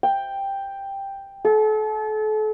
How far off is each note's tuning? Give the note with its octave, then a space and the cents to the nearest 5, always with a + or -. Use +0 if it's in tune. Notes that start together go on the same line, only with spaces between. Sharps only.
G5 +5
A4 -35